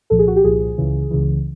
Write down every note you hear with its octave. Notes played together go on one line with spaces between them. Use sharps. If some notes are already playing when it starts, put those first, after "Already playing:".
C2 A#2 F3 A4
G#4
F#4
G4
C2 A#2 F3 G#4
C#2 C#3 E3
C#2 C#3 E3